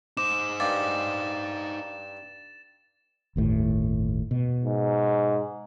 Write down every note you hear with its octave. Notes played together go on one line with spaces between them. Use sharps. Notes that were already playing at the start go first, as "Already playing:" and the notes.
D#4 C5 D6 E7
G2 F5 D6 A6
G1 D#2 A2
B2
G#2